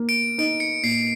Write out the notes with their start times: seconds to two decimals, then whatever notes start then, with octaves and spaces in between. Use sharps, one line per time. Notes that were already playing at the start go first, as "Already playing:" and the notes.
Already playing: A#3
0.09 D7
0.38 D#4 D7
0.60 C#7
0.83 A#2 C7